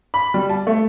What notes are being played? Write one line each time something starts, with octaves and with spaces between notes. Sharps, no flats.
B5
G3
A5
A3